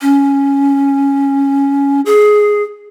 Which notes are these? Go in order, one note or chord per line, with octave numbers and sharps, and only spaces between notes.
C#4
G#4